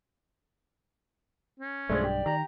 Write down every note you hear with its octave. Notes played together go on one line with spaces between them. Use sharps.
C#4
B1 G2 F3 G#3 A3 D5
G4
D#3 G4 A#5